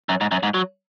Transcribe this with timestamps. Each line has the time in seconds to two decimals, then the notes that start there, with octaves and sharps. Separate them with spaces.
0.09 F#2
0.21 G#2
0.31 F#2
0.43 G#2
0.54 F#3